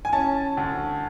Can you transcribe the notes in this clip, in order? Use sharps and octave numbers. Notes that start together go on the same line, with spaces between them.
G#5
C#4 A5
D2